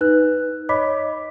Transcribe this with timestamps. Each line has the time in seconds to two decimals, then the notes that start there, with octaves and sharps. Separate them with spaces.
0.01 D#4 B4 F#6
0.69 C#5 D#5 B5 D6 B6